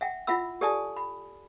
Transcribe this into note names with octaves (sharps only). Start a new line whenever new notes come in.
E5 F#5 G5
E4 F4 E5 F#5 B5 E6
G4 A4 D5 G#5 A5 D#6
B5